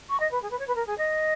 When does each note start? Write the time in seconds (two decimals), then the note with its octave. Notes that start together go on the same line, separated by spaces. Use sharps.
0.09 C#6
0.19 D#5
0.31 B4
0.42 G#4
0.50 B4
0.59 C#5
0.67 B4
0.75 A#4
0.86 G#4
0.97 D#5